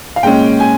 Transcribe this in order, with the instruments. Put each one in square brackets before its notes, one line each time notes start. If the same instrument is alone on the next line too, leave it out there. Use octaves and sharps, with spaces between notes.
[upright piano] F5
A#2 G#3 C#4 G5
G#5